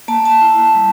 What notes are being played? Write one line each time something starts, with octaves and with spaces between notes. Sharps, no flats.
A#3 A5
A5
E4
G3